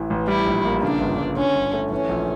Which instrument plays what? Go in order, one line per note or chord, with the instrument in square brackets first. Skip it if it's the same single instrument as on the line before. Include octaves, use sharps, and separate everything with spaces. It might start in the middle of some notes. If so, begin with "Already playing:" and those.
Already playing: [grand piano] A1 E3
A1
[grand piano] G3 [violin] E4
[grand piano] A#1
A#3
[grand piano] C#3 [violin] D4
[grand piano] G1
G1
[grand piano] D3 [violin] C#4
[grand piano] G1
A3
[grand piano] E3 [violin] C#4
[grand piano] A#1